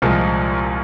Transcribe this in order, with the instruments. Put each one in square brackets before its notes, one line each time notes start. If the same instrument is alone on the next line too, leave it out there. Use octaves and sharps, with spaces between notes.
[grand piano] C2 A#2 F3 G#3